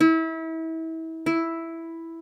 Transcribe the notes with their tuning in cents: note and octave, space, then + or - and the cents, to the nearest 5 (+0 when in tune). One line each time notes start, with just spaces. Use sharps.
E4 -30
E4 +0